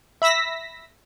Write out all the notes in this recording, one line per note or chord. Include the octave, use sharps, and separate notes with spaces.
E5 B5 E6 A#6 B6